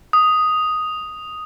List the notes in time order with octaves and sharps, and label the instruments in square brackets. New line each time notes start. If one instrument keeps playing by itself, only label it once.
[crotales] D#6